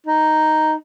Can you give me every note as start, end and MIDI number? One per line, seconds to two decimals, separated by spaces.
0.06 0.74 63